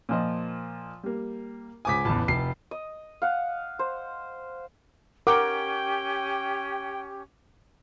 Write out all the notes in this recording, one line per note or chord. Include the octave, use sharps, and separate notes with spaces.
A#2 F3 D#5
G3 A#3
C#2 C5 G#5 D6 D#6 B6
A1 E2 A5 B5
F1 C7
D#5
F5 F#5
C5
C#4 G4 A#4 F#5 G5 D6